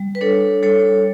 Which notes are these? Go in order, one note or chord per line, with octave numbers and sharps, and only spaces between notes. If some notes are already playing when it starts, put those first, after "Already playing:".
Already playing: G3
B4
D4 A4 C#5
G3 A4 C#5